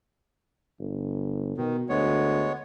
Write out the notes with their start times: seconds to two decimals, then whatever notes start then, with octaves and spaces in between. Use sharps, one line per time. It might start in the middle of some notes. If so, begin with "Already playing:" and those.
0.79 G1
1.58 B2 D#3
1.89 D2 G#3 B3 C#5